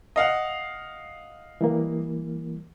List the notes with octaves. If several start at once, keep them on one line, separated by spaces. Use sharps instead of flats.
D#5 F5 F#5
E3 G3 A#3